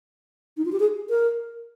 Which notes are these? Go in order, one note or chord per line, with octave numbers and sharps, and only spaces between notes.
D#4
F4
G4
G#4
A#4